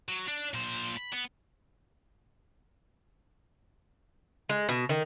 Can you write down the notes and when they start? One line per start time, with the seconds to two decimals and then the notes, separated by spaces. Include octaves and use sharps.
0.09 F#3
0.28 D4
0.54 A#2 C5
0.97 B5
1.13 B3
4.49 G#3
4.69 B2
4.89 D#3